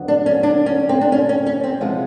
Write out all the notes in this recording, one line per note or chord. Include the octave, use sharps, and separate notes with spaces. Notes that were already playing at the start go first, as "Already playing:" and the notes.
Already playing: F2 D3 F#3 B3
D4
C#4
D4
C#4
C4
D4
C#4
C#4
C#4
C4
C3 F3 G#3 B3